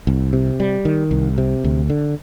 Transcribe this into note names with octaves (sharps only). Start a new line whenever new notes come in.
C2
C3
G3
D#3
C2
C3
D2
D3